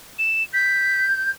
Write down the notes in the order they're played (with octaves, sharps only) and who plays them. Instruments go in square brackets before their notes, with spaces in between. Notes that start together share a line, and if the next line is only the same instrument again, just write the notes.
[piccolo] E7
[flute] G6 [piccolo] B6